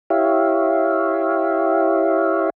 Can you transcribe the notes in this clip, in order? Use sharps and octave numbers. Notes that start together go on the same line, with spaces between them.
E4 G4 C#5 E5 F5